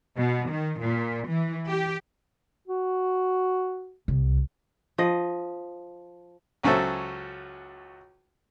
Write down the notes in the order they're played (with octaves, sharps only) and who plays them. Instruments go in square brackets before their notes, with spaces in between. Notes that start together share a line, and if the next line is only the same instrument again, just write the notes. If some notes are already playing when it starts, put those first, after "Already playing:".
[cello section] B2
D#3
A#2
E3
G4
[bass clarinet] F#4
[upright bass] C2
[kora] F3 D#5
[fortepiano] C#2 F#3 C#4 A4 C5 E5